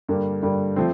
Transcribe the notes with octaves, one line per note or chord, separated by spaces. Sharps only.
G2 D3 G3 A#3
G2 D3 G3 A#3
F3 A3 C4